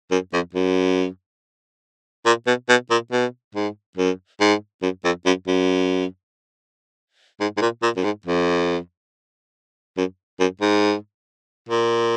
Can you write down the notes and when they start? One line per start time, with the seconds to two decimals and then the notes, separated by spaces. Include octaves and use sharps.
0.11 F#2
0.33 F2
0.54 F#2
2.25 A#2
2.47 B2
2.69 B2
2.90 A#2
3.12 B2
3.55 G#2
3.97 F#2
4.41 G#2
4.83 F#2
5.04 F2
5.26 F#2
5.47 F#2
7.40 G#2
7.57 G#2
7.61 A#2
7.83 A#2
7.97 F#2
8.04 G#2
8.26 F2
9.97 F#2
10.40 F#2
10.61 G#2
11.69 A#2